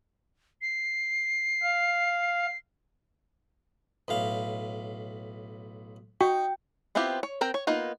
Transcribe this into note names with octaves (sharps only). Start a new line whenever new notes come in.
C7
F5
B1 A2 F5
D#4 F#4 G5
B3 C4 E4 F4 G4
C#5
C4 A#4 G5 A#5
C#5
A#3 B3 D#4 F4